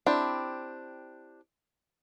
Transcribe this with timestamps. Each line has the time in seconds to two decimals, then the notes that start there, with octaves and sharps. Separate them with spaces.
0.06 C4 D4 E4 G4